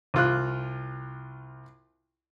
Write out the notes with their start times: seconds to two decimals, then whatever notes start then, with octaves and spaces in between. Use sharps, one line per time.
0.14 C2 F4 F#6